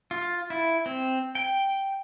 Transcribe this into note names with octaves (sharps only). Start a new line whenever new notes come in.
F4
E4
C4
G5